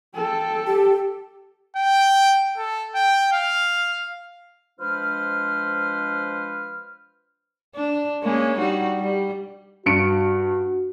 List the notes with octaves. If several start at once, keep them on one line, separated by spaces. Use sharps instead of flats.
A4 G5
G4
G5
A4
G5
F5
F3 G#3 D4 B4 C5 F6
D4
G#3 A#3 C#4
G3 D#4 F#4
G3
G2 F#4 C#7 D7